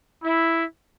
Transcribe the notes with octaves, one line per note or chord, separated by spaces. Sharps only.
E4